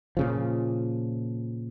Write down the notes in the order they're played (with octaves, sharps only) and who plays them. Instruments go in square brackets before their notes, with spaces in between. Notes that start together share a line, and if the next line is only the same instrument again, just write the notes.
[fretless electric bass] A#2 C#3 F3